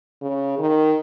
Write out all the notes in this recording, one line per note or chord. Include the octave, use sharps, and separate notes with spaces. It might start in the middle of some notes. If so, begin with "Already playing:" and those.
C#3
D#3